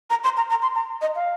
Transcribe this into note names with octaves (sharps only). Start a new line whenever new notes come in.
A#5
C6
A#5
A#5
C6
A#5
D#5
F5